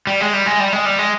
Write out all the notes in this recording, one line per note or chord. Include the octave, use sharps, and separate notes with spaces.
G3
G#3
G3
G#3
G3
G#3
G3
G#3